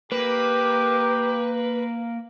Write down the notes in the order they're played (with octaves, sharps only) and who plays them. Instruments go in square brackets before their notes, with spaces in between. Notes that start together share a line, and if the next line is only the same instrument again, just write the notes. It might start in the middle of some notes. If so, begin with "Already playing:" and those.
[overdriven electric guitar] A#3 [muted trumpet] G4 [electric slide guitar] B4